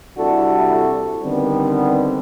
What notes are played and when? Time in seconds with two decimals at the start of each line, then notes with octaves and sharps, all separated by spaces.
0.18 C3 G3 D4 E4 F#4 A4
1.23 D3 D#3 G3 B3 C4